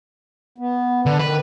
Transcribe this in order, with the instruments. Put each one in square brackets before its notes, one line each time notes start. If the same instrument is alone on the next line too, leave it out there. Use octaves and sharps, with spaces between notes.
[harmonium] B3
[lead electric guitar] D3 [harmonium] D4 B4
[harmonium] D#3 [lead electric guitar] B4